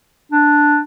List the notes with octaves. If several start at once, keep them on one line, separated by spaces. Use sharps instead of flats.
D4